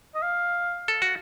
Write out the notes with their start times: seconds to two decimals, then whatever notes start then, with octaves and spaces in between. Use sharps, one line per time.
0.15 D#5
0.22 F5
0.88 A4
1.02 F#4